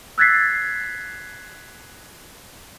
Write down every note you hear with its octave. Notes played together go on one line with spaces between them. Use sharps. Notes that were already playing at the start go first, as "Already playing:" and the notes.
E6 F#6 G#6 A6 B6 C7